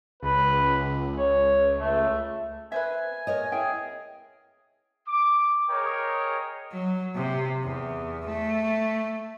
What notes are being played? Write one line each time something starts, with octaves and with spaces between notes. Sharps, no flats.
C#2 B4
C#5
A3
B4 C5 E5 G#5
A#4 C#5 D#5
E4 G#4 E5 G5
D6
G#4 A#4 C#5 D#5 G5
F#3
C3
E2
A3